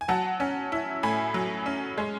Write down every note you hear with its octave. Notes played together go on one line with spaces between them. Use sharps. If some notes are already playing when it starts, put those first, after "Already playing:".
G#5
F#3 F#5 A5
C#4
E4
A2 G#5 B5
F#3
C#4
G#3